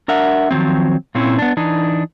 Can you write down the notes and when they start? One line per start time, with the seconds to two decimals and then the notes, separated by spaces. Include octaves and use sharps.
0.08 D4 A#4 E5 F#5
0.51 D#3 F3 F#3 C4
1.15 A#2 C4 C#4 E4
1.39 B3 D4
1.57 E3 D4 D#4